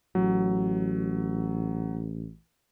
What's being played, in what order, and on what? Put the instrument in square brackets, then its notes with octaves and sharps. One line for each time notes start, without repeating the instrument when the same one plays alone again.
[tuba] A1 [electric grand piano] F#3